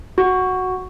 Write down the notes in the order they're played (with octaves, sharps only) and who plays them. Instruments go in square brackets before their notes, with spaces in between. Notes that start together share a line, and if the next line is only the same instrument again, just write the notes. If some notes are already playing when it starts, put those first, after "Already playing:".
[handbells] F#4